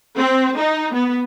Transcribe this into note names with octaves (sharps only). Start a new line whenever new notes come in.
C4
D#4
B3